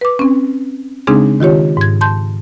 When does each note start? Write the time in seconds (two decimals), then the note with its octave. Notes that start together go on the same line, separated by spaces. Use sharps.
0.01 B4 D6
0.19 C4 C#4
1.07 C#3 G#3 C4 D4 D#4 G#4
1.40 D#3 F4 G4 C#5
1.77 G#2 G#6
2.01 A5 C6 G6